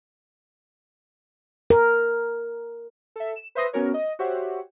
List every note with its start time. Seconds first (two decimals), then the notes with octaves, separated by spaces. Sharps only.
1.70 A#4
3.16 A4 E5
3.36 E7
3.55 B4 C5 E5 C6 D#6 A#6
3.73 B3 C#4 F#4 A#4 C#5
3.94 D#5
4.19 F#4 G4 C5 C#5 E5 F#5